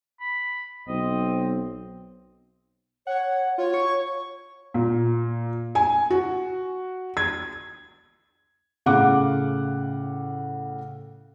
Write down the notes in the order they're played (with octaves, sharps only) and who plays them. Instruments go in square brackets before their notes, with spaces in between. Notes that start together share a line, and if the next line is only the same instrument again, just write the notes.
[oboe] B5
[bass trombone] B1 [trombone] C4 [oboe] D#5
[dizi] C#5 [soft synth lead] F#5
[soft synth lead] F4 [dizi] C#5
[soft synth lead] C#6
[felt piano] A#2
G#5
F#4
G#6
A2 C#3 F5 F#5 D6 F#6